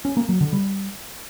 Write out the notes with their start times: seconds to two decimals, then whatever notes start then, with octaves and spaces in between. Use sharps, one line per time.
0.05 C#4
0.17 A#3
0.29 F#3
0.41 D3
0.53 G3